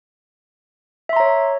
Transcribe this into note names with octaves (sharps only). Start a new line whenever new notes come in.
C#5 E5 A#5 C6